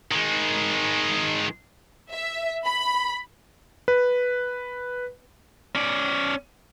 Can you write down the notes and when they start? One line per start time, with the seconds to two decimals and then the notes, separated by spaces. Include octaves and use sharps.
0.12 D#3 G#3
2.12 E5
2.65 B5
3.88 B4
5.75 C#4 D5